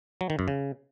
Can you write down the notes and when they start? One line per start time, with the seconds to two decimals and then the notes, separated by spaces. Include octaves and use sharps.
0.21 F#3
0.30 D#3
0.39 F#2
0.48 C#3